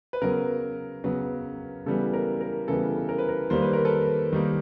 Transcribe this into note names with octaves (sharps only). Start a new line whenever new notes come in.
B4
C#3 F#3 B3 A#4
C#3 F#3 B3
C#3 E3 G3 B3 A4
A#4
A#4
C#3 E3 G3 B3 A4
A#4
B4
A#4
D#3 G3 A#3 C5
B4
A#4
A4 B4
D#3 G3 A#3